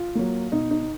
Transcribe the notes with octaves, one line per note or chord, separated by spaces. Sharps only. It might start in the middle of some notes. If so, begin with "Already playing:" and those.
Already playing: F4
F#3 A#3
B2 D#4
D#4